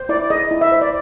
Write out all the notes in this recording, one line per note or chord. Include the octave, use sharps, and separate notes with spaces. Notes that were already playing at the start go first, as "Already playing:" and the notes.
Already playing: C5
E4 D5
G#4 D#5
E4
E5
C5
D5